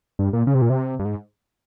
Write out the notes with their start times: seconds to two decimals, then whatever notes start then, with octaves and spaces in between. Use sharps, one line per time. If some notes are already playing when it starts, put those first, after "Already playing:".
0.19 G2
0.33 A#2
0.47 C#3
0.55 C3
0.62 A#2
0.70 C3
0.99 G2
1.05 G#2